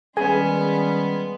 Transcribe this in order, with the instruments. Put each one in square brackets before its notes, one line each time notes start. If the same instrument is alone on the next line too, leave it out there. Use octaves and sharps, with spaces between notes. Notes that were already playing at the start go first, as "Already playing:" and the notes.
[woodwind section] D#3 G3 C#4 [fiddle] G#3 B3 [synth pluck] G#4 [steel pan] G#5